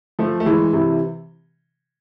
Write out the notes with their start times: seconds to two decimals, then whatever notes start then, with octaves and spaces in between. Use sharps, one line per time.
0.19 F3 A3
0.40 A3
0.46 E3 G#3
0.73 C3 E3